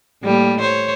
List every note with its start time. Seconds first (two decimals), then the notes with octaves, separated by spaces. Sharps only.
0.23 A2 G3 A#3
0.60 C5 C#5